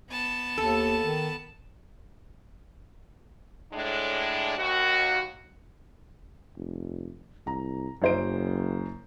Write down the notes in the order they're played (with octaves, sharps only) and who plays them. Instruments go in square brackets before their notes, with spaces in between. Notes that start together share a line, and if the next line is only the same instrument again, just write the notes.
[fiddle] B3 A5
[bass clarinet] D#2 [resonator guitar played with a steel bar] A4
[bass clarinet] D#3
[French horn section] A2 G#3 D4
D#2 F#4
[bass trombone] F1
[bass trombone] C2 [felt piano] A#5
[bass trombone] F#1 [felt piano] F#2 C5 D7